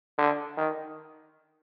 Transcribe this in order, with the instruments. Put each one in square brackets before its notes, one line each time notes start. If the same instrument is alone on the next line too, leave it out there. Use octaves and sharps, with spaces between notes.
[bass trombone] D3
D#3